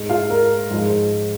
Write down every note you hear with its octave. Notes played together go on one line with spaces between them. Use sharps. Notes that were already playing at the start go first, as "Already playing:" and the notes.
Already playing: G#2 G#3
F4 F5
A#4
G#2 F3 G#3